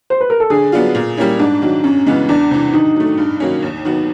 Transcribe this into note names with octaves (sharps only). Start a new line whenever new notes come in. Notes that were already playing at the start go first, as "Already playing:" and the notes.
C5
B4
A#4
A4
D3 G#4
F#3 B3 D4 F4
A#2
G3 A#3 C#4 E4
G#2 D4
D#3 F#3
F#2 C#4
C#3 E3 G#3 B3
E2 D4
C3 E3
D#3 D#4
F#3 A3
G2
D#3 F#3 A#3 C#4
D#2
D#3 F#3 B3